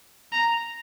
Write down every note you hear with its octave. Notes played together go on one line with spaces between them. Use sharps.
A#5